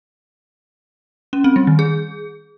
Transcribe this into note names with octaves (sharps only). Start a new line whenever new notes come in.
C#4
C4
G3
D#3
G#4